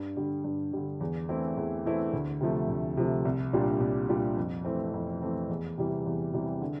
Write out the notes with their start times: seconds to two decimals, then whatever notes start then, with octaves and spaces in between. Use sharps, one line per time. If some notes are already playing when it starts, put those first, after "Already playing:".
Already playing: G2
0.17 D3 G3
0.44 G2
0.73 D3 G3
1.00 E2
1.29 E3 A3 C4 E4
1.57 E2
1.85 E3 A3 C4 E4
2.13 D2
2.41 C3 F3 A3
2.68 D2
2.97 C3 F3 A3
3.25 C2
3.53 A#2 G3 D4 F4
3.80 C2
4.09 A#2 G3 D4 F4
4.37 F2
4.65 E3 A3 C4
4.94 F2
5.22 E3 A3 C4
5.49 E2
5.78 C3 E3 G3
6.06 E2
6.33 C3 E3 G3
6.62 D3